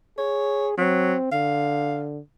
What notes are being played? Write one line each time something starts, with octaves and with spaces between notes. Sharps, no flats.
G#4 C#5
F#3 C4
D3 F5